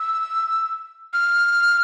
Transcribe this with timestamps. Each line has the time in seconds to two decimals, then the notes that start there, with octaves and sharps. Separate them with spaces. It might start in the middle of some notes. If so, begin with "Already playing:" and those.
Already playing: E6
1.13 F6